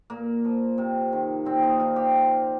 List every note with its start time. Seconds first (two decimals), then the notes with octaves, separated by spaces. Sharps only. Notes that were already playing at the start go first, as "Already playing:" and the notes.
0.10 A#2 A#3
0.45 F3
0.78 C3
1.13 D#3
1.45 A#2 C4
1.63 D#4
1.79 F3 F4
1.96 G4
2.14 C3